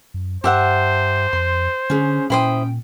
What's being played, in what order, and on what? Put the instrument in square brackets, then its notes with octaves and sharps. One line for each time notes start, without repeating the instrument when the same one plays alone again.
[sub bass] F#2
[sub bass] G2 [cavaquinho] G4 E5 F#5 [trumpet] C5 [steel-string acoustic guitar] A5
[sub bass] F2 [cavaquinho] C6
[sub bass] D3 [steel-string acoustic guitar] C#4 G#4
[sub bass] A#2 [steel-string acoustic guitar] C#4 G5 [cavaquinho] E4 C5 D#6